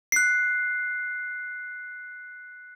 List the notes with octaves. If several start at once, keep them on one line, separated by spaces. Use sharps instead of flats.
F#6 C7